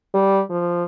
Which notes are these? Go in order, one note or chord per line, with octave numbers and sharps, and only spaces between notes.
G3
F3